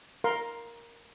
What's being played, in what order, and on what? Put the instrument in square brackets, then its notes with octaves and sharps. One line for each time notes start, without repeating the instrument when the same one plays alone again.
[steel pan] A#4 F5 C6